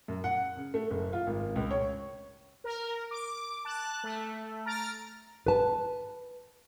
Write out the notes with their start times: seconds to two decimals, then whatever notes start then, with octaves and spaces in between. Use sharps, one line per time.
0.08 F#2
0.24 F#5
0.57 C#3
0.74 A3
0.91 F#1
1.13 F4
1.27 G#1
1.56 C#2
1.71 C#5
2.64 A#4
3.11 D6
3.65 A5 F#6
4.04 A3
4.66 A#5 F6 A6 D7
5.46 B4 A5